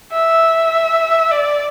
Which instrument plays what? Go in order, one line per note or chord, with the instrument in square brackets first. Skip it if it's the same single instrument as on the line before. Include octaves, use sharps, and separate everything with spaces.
[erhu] E5
D5